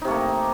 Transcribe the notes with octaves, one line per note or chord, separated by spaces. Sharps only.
C3 A3 A#3 D#4